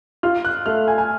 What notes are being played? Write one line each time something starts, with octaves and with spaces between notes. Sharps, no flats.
F4 F6
F#6
A3 F6
G#5
G#5